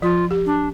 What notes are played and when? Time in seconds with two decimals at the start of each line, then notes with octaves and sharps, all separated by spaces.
0.02 F3 F4
0.31 G4
0.46 D4